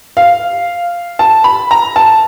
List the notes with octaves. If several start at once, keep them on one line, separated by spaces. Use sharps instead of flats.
F5
A5
B5
A#5
A5